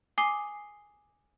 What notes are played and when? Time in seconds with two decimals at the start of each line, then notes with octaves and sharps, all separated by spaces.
0.18 G#5 D6 D#6 C7 G7